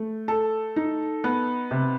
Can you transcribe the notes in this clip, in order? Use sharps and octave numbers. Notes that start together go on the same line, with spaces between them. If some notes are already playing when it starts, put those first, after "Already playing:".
Already playing: A3
A4
D#4
B3
C3